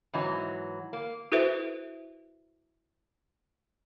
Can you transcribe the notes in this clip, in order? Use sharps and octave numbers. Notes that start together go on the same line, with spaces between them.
G#2 E3 F#3
A#3
E4 F#4 A4 B4 C5 E5